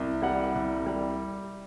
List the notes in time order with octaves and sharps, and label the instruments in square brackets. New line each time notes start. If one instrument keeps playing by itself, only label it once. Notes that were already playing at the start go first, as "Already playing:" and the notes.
Already playing: [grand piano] C2
G3 F#5
C2
G3